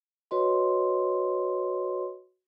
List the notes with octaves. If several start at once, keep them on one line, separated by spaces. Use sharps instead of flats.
F#4 B4 C#5 D#5 C6